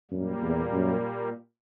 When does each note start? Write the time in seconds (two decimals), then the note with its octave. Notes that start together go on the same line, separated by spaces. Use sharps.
0.11 F#2 A#2 G3 A#3
0.42 E2
0.73 F#2